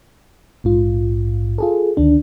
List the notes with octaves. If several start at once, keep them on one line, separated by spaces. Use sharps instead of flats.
A#1 G#2 F4
F4 G#4 A4
D2 D#3 D4